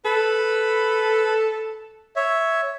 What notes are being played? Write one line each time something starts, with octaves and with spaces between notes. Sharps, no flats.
A4 B4 B5
C#5 E5